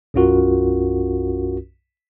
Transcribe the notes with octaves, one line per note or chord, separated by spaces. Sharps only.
B1 F#2 C#4 F4 F#4 A#4